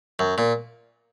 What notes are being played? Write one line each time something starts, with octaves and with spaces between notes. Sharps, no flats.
F#2
A#2